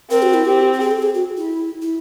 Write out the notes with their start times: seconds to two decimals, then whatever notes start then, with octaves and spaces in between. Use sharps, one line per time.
0.10 C4 A#4
0.22 F#4
0.34 E4
0.45 C4 G4
0.73 G4
0.80 G#4
0.91 A4
1.02 G#4
1.15 F#4
1.37 E4
1.82 E4